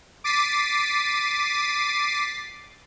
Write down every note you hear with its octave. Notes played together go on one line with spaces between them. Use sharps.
D6 A6 B6 C7 D#7